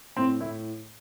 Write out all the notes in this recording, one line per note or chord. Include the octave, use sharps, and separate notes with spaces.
A2 C4
A2 E4